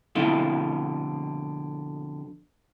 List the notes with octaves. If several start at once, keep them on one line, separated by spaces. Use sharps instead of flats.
F2 B2 D3 A3 E4 F4